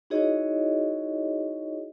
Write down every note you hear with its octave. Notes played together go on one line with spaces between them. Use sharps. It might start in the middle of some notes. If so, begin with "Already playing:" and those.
D#4 E4 F#4 G#4 C#5 D#5